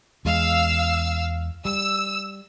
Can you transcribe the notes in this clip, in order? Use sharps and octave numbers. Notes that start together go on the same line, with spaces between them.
E2 G#3 F5 E6
G3 E6